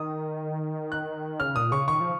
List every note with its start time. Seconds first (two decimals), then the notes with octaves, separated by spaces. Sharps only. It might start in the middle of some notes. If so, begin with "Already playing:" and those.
Already playing: D#3 D#6
0.92 F#6
1.40 C#3 F6
1.56 A#2 D#6
1.72 C#3 C#6
1.88 D#3 C#6
2.00 F3